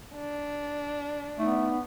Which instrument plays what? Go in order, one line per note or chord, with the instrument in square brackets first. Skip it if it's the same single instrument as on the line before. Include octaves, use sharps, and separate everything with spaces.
[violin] D4
[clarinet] A3 [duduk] B3 [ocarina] D#4